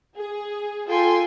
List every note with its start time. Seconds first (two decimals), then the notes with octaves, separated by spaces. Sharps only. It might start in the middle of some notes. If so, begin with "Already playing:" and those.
0.16 G#4
0.88 F4 A4 G5 G#5 C6